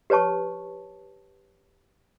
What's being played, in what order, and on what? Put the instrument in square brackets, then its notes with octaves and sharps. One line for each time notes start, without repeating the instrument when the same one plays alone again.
[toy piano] G4 B4 C#5 A5 C#6